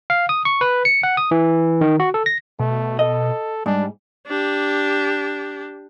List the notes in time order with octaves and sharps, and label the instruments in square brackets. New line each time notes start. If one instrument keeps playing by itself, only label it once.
[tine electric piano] F5
D#6
C#6
B4
C#7
F#5
D#6
E3
D#3
F#4
A4
A#6
[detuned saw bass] B2 [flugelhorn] A3
[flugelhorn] A4 [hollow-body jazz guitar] D#5
[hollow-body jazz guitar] G#2 [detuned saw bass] G3 [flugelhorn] D4
[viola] D4 G4